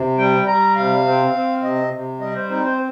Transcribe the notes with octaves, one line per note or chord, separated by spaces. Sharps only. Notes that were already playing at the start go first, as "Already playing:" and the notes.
Already playing: C3
G3 G5
G3 A#5
C3 F5
C4
C4
C3 D#5
C3
G3 D#5
C5
C4 D#4
C5